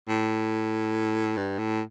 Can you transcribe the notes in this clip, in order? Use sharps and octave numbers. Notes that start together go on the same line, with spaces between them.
A2
G2
A2